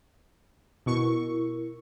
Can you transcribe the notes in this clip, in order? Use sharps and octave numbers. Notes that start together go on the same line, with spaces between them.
B2 E4 A#4 C#6